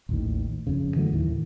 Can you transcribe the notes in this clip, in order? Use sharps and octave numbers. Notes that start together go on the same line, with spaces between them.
A1 D#2 A2 D#3
F#1 F2 C#3
D3 E3 F#3 A3
D#2 A2 D#3 E3